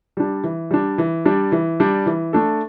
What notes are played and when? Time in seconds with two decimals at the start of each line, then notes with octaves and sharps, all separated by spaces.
0.17 G3 D4
0.44 E3
0.71 G3 D4
0.98 E3
1.25 G3 D4
1.52 E3
1.80 G3 D4
2.06 E3
2.33 A3 D4 A4